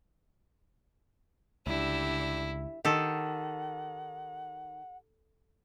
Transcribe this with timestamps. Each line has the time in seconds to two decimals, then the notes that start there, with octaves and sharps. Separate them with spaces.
1.67 C#2 D3 G3 E4 E6
2.85 D#3 G4 A4 F#5